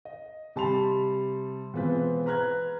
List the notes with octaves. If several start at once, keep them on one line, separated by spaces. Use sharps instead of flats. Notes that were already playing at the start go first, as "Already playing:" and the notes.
D#5
C3 G3 A5 B5 C6 F7
B2 E3 G#3 C4 F4 B4
B4 A#5 F6 F#6 G#6